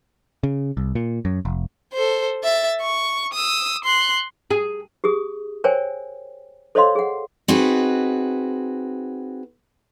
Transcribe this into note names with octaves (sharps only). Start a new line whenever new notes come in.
C#3
C2
A#2
F#2
F1
A4 C5
E5 A6
C#6
D#6 E6
C6 F#6
G#4
G4 G#4 D#6
A#4 C5 C#5 G5 G#5
A4 C5 C#5 D#5 F5 C6
G#4 F#5
C4 D#4 F#4 G#4 B4